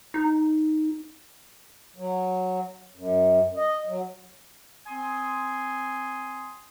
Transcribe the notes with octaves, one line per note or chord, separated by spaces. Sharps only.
D#4
F#3
F#2
D#5
F#3
C4 G#5 C6 D#6